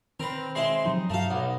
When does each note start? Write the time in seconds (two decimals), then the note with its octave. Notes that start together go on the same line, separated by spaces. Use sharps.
0.20 D#3 C4 A#4 B4
0.55 G#3 C4 E4 C6
0.86 C3 F3 F#3 D#4
1.10 G2 F#3 A3 F#4 F5
1.31 B1 F5 F#5